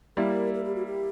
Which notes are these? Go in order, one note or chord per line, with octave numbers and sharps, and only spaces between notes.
G3 A#3 E4 A#4
A#4
G4
F#4
G4